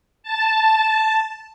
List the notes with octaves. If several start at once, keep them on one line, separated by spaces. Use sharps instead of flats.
A5